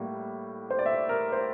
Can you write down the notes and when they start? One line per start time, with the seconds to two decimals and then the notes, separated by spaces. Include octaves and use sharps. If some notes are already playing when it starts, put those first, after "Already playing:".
Already playing: A2 G3 A#3
0.70 C5
0.79 D5
0.86 E5
1.09 A#4
1.32 C5